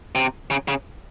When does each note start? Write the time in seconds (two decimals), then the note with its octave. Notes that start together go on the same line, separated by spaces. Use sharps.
0.15 C3
0.50 C#3
0.68 C#3